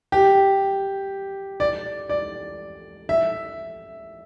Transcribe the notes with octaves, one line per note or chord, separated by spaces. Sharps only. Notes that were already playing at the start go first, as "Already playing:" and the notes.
G4
D5
D5
E5